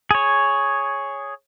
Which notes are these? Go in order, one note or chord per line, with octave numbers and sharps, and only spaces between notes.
G#4 C#5